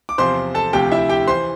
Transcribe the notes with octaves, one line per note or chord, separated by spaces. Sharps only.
D6
E2 C3 F3 C5 C6
A4 A5
D2 C3 F3 G4 G5
E4 E5
G4 G5
E3 C5 C6